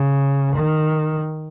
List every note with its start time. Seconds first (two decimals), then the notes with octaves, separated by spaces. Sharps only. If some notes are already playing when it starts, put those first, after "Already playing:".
Already playing: C#3
0.56 D#3